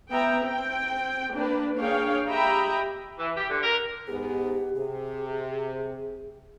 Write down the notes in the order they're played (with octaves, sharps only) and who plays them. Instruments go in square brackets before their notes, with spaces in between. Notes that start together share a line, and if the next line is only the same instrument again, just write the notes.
[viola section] B3 E5 G5 A#5
C4 G5
A#3 D4 B4
A#3 D4 G#4 C#5 F5 G5
G4 D#5 E5 G5 A#5 B5
[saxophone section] E3
G4
D3
A#4
[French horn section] G#2 B3 G#4 [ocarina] G4
[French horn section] C3 [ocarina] G#4